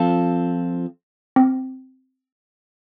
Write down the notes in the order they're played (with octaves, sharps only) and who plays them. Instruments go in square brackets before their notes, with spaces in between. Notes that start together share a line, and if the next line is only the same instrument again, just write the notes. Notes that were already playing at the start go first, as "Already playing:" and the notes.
Already playing: [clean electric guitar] F3 C4 F4 A4
[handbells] C4